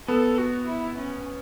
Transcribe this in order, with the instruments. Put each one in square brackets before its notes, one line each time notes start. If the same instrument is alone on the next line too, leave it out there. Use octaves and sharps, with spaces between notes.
[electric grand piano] B3 [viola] A4
[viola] F#4
E4
C#4